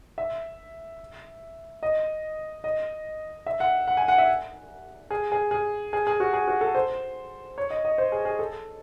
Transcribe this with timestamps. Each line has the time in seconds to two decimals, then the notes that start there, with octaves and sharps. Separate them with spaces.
0.18 E5
1.83 D#5
2.64 D#5
3.46 E5
3.60 F#5
3.87 F#5
3.97 G#5
4.08 F#5
4.18 E5
5.11 G#4
5.32 G#4
5.51 G#4
5.93 G#4
6.07 G#4
6.20 F#4
6.33 G#4
6.48 F#4
6.61 A4
6.75 C5
7.58 C#5
7.70 D#5
7.85 D#5
7.98 C5
8.12 G#4
8.25 G#4
8.39 A4